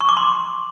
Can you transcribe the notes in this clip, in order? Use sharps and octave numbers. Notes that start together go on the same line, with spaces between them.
C#6
D6
C6